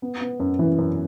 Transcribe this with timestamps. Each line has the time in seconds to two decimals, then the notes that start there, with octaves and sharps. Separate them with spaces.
0.02 B3
0.21 B3
0.40 F#2
0.59 E3
0.78 F#2